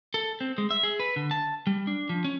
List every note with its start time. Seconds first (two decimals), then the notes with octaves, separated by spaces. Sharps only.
0.14 A4
0.41 C4
0.58 G#3
0.71 E5
0.83 G#4
1.00 B4
1.16 D3
1.31 A5
1.67 G3
1.87 D4
2.09 F3
2.24 C#4